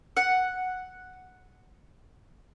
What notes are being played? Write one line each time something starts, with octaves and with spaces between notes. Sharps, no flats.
F#5